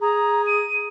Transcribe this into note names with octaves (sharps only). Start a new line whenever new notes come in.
G#4 A#5
D#7